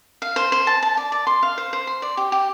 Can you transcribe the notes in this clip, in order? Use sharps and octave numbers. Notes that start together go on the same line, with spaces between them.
F5
C5
C5
A5
A5
D5
D5
C6
F5
C5
C5
C6
D5
G4
G4